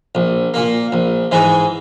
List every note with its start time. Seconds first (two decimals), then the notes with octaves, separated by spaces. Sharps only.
0.15 A#1
0.54 A#2 A#3
0.92 A#1
1.31 G#2 E3 G#3